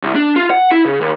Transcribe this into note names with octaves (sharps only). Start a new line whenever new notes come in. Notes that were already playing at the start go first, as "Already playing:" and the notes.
C2
D4
F4
F#5
E4
C#3
D#2